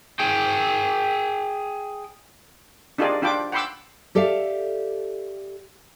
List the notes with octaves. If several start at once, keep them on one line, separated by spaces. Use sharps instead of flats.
G#4 G5
D4 D#4 F4 G4 G#4 D5
D4 F4 G5 B5 D6
F#5 G5 B5 C6 D6 E6
G4 A4 D5 E5 F5